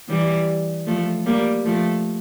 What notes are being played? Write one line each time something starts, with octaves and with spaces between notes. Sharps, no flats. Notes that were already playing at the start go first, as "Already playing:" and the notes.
E3 G3
F3 A3
G3 A#3
F3 A3